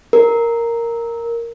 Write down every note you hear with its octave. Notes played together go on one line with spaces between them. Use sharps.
A#4